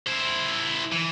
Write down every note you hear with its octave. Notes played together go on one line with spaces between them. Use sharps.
E4 C5
E3